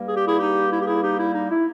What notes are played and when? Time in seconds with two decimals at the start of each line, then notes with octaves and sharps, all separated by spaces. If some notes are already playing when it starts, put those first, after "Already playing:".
Already playing: G2 G3 A#3
0.08 G#4
0.17 G4
0.27 E4 G#4
0.40 D#4 G4
0.71 E4
0.80 G4
0.87 E4 G#4
1.03 D#4 G4
1.18 E4
1.35 D#4
1.51 E4